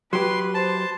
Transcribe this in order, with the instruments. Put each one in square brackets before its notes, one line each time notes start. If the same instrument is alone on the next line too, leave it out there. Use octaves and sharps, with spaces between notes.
[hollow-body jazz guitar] F#3 G4 [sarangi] B4 [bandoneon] C6
[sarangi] C5 [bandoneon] A5